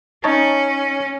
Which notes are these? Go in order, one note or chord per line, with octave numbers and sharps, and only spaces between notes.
C#4 D#4 C#5 A5